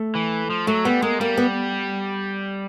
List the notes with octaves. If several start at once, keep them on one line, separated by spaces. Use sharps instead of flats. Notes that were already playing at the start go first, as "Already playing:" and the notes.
Already playing: A3
E3
F3
F#3 A3
G3 B3
G#3 A#3
G3 A#3
B3